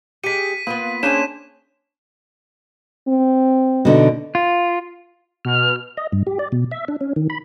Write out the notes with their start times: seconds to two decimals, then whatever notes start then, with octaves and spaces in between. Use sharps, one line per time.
0.24 G#3 G4 B6 C#7 D#7
0.67 A#3 B3 F4 B4
1.03 A#3 C#4 D4 G#4 C5 C#5 E7
3.08 C4
3.85 B2 D3 D#4
4.35 F4
5.45 B2 F6
5.97 D#5
6.12 G2
6.27 G4
6.39 D5
6.52 B2
6.71 E5
6.88 D4
7.01 C#4
7.16 D#3
7.30 B5